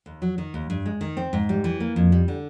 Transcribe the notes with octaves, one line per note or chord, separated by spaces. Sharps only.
D#2
F#3
D#3
D#2
G2
G#3
D#3
C4
G#2
G3
E3
A#3
F2
G3
D3